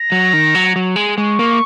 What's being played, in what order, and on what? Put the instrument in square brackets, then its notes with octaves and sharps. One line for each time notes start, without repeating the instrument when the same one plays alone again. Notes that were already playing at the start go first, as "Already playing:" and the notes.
Already playing: [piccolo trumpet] A#5
[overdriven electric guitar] F#3
D#3
F#3
F#3
G#3
[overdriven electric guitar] G#3 [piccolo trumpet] C#6
[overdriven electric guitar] A#3